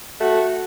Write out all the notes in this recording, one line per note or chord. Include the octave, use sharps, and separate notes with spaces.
A3 F#4